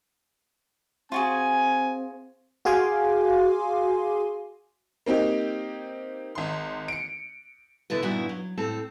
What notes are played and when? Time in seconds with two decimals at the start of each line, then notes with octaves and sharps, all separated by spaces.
1.12 C4 F4 F#4 G#4 G#5
2.65 F#4 G#4 F5 G#5 C6 D6
5.06 A#3 C4 D#4 G4
6.35 G#1 C6
6.88 C#7 D7
7.90 B2 D3 E4 B4
8.02 G2 A#2 D#3 B3 E4 F#4
8.29 F#3
8.58 A2 C4 A4